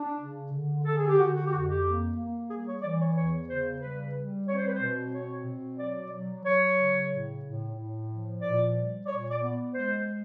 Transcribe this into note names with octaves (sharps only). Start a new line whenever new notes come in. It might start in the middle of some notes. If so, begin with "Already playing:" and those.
Already playing: D4
C#3
D3
D3 A4
G#4
G4
D3 F#4
F#4
G4
F2 F#4
G4
A#3
A#3
G3 G#4
C#5
E3 D5
C#5
E2 C#5
C#3 C5
G3 B4
G3
C4 C#5
C5
B4
C5
B2
C4 C#5
B2
F#3 D5
D5
F#3
F#3 C#5
C#3
A2
A2
A2
F3
A#2 D5
G3
D5
A#2 C#5
D5
B3
G#3 C5